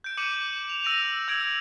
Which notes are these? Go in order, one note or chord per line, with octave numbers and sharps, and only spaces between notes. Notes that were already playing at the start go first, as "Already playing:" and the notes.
G6 D7
D6 G6 C#7 D#7 E7 F#7
F7
E6 A#6 D7 D#7 F7
E6 G#6 D7